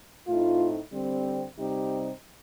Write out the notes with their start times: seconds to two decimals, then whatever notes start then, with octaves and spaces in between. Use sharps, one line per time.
0.28 A2 A3 C4 D#4 F4
0.93 D3 G3 C4
1.58 C3 G3 C4 D#4 G4